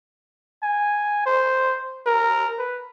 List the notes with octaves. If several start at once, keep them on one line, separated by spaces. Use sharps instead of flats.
G#5
C5
A#4
B4